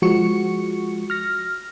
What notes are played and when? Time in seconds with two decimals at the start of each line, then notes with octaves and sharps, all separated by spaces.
0.02 F3 G#3 F#4 C#6 C#7
1.10 F6 A#6